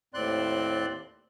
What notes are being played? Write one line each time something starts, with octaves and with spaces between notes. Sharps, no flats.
D#2 A2 C4 D5 C6 F#6